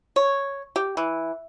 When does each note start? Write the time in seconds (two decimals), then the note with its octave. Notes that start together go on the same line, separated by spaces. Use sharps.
0.16 C#5
0.76 G4
0.97 E3